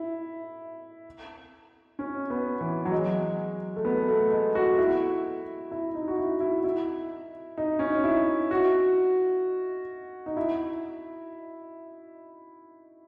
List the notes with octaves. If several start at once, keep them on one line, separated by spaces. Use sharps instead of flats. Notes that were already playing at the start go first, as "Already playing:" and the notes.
Already playing: E4
C#4
B3
E3
F#3
G#3
A3
B3
A3
G#3
F#4
E4
E4
D#4
F#4
E4
E4
E4
D#4
C#4
D#4
E4
F#4
D#4
E4